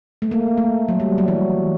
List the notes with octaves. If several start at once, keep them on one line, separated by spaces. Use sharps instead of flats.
A3
A#3
A3
F#3
G3
F#3
E3